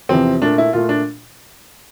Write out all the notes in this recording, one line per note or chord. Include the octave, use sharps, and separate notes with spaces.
E2 C3 F3 C4
A#2 A3 D4
E4
A#2 A3 F4
D4